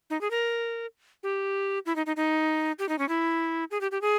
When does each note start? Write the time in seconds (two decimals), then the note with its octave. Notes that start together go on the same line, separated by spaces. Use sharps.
0.10 D#4
0.21 G#4
0.31 A#4
1.23 G4
1.86 E4
1.96 D#4
2.06 D#4
2.16 D#4
2.79 G4
2.89 D#4
2.99 C#4
3.09 E4
3.71 G#4
3.81 G4
3.91 G4
4.01 G#4